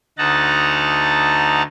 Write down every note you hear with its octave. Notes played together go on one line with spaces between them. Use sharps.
D2 D#4 F#5 A5 A#5